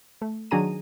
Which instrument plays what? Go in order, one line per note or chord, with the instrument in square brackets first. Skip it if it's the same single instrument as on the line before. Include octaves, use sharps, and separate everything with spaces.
[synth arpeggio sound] A3
D#3 F#3 D4 G#4 A#5 D#7